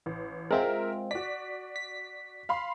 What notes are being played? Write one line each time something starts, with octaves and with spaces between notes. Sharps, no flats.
A1
G#3 C4 F4 A#4 E5
F#4 D5 B6
B6
F5 B5 C6